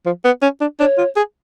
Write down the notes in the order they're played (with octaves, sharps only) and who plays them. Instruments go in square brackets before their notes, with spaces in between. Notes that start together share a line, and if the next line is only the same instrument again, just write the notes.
[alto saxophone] F3
B3
C#4
D4
[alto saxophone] D4 [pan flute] C#5
[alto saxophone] F4
G#4